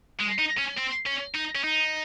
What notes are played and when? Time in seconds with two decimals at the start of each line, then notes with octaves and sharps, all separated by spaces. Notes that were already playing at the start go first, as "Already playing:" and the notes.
0.19 G#3
0.38 D#4
0.57 C#4
0.77 C4
1.06 C#4
1.34 D#4
1.55 C#4
1.64 D#4